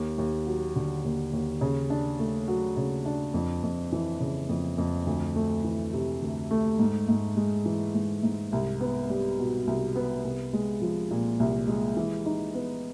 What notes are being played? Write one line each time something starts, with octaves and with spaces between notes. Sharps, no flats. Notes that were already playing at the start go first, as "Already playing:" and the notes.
Already playing: D#2
D#2
F#3
D3
D#2
D#2
C#3
D4
A3
F#3
C#3
D4
F2
F2
E3
C#3
F2
F2
D2
A3
E3
C3
D2
A3
G#2
G#2
G#3
E3
G#2
G#2
C2
B3
G3
B2
C2
B3
C2
G#3
F3
A#2
C2
G#3
E3
D#4
B3